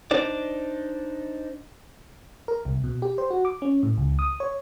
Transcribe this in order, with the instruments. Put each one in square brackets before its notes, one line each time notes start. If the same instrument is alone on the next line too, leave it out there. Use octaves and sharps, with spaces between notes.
[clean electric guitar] D4 D#4 C5 D5
[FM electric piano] A#4
C2
B2
G4
C5
F#4
D6
C#4
A2
C#2
D#6
C#5